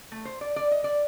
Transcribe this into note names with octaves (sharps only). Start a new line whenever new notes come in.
A3
C5
D5
D5
D#5
D5